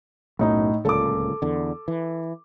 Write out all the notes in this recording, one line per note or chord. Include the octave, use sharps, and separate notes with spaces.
B1 F#2 A2 D#4
D1 C#2 A#2 A4 D6
E2 D3
E3